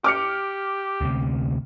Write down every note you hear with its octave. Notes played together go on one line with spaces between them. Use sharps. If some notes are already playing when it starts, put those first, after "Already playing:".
G4 D6 F6 C#7
D2 C3